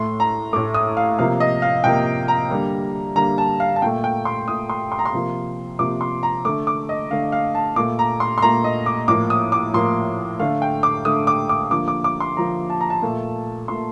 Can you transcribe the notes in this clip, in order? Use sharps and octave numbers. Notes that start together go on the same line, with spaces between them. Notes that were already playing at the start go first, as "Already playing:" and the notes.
Already playing: A2 A3 C6
A#5
A2 A3 D6
D#6
F5
C3 F3 A#3 F5
D#5
F5
C3 F3 A#3 G5
A#5
D3 G3 A#3
D3 G3 A#3 A#5
A5
F5
A5
A#2 A3 G5
G5
C6
A#2 A3 D#6
C6
C6
A#5
C6
C3 F3 A#3
C3 F3 A#3 D6
C6
A#5
D3 A3 D6
D6
D#5
D3 A3 F5
F5
A5
A#2 A3 D6
A#5
C6
C6
A#2 A3 A#5
D#5
D6
A2 F3 A#3 D6
D#6
D6
A2 F3 A#3 C6
D3 A3 F5
G5
D6
D3 A3 D#6
D6
D6
D3 F3 A#3 D6
D6
D6
C6
D3 F3 A#3 A#5
A5
A#5
A5
A#2 A3
A#2 A3 C6